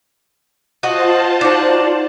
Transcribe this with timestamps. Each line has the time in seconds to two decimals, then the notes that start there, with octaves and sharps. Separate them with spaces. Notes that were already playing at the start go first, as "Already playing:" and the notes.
0.83 F4 F#4 C5 D#5 A5
1.41 D4 D#4 F#4